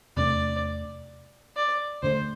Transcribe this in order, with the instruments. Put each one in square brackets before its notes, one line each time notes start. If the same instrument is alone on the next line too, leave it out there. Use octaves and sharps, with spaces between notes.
[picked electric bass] E2 C3 A3 D4 [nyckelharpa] D5
[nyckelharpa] D5
[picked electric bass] D2 D3 A3 D4 [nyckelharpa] C5